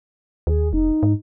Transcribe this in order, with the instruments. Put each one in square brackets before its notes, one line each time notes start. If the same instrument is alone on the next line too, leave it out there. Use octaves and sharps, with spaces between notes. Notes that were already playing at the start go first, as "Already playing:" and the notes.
[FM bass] D#2 [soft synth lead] G#4
[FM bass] F1 [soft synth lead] D#4
[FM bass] G#2